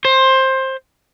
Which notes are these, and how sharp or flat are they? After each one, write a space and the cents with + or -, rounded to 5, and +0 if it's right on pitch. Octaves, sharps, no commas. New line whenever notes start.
C5 +15